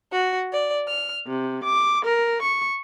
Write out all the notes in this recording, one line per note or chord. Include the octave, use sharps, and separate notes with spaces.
F#4
D5
F6
C3
D6
A#4
C#6